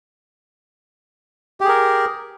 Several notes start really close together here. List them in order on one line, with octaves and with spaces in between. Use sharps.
G4 G#4 A#4